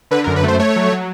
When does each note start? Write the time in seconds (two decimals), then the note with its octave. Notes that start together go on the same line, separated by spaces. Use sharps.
0.11 D3 B4
0.24 F#2 A#4
0.36 B4
0.43 A3 C5
0.59 A3 C#5
0.76 F#3
0.92 F#3